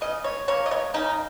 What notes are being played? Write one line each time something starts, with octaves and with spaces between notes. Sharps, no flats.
C#3 D#5
C#5
A#3 C#5
D#5
C#5
C#3 D#4